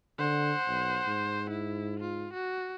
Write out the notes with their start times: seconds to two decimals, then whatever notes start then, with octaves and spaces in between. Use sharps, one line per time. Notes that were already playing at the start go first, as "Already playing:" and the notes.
0.19 D3 C5 F#5
0.68 B1
1.07 G#2
1.50 E4
2.00 F4
2.34 F#4